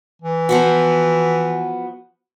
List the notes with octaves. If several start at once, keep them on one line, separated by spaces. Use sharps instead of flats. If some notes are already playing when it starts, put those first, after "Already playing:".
E3
F3 B3 F#4